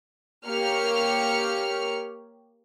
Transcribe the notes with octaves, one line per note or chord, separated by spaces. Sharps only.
A#3 G4 C#5 F6 C#7